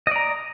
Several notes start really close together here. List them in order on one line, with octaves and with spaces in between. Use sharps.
D#5 D5 A#5